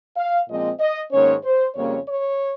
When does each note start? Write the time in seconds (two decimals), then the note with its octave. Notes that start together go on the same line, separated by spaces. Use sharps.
0.17 F5
0.48 A#2 F3 G#3 C4 D#5
0.80 D#5
1.12 G#2 D#3 A#3 C#4 C#5
1.44 C5
1.75 F2 C#3 G3 A#3 C#4 C#5
2.07 C#5